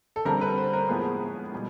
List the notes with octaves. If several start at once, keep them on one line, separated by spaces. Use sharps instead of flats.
A4
D3 G3 C4 A#4
B4
C5
A#4
A2 F3 G#3 B3 G#4
B2 G3